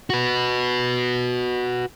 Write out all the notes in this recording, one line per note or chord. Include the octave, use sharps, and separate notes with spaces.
F#4 B4